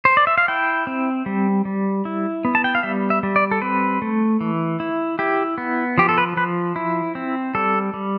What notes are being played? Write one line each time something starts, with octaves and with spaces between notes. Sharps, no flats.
C5
D5
E5
F5
E4 G5
C4
G3
G3
E4
B3
A5
G5
F5
G3 E5
E5
G3
D5
A4
C4 B4
A3
E3
E4
E4 G4
B3
F3 G4
A4
B4
F3 B4
E4
C4
G3 A4
G3